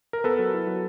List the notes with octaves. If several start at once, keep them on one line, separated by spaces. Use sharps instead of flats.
A#4
B3 A4 B4
F#3
E4
F#3